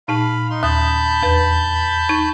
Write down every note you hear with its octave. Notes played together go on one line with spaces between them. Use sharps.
A#2 D#4 F5 A5 B5
D#4 C6
D#2 A5 B5 D#6 G6
E2 B4
D#4 C#6 G#6